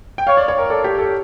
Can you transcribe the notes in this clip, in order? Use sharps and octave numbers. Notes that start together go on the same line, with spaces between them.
G5
C#5 F5
D5
C#5
A#4
A4 D5
G4
A4